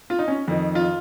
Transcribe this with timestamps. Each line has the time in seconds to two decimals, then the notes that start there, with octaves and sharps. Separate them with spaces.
0.10 F4
0.19 D#4
0.28 C#4
0.48 F2 D#3
0.75 F4